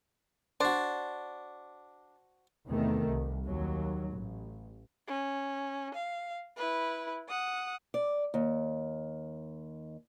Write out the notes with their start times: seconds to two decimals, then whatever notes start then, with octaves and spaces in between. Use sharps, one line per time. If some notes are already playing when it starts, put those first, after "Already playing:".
0.60 D4 F#4 C5
2.66 E2 C3 D#3 A3
3.07 C2
3.45 D#2 F#3
4.13 A1
5.07 C#4
5.94 F5
6.57 E4 B4
7.29 F#5 D#6
7.94 D5
8.34 D#2